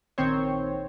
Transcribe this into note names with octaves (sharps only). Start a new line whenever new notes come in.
A#1 D#3 C4 C5 C#5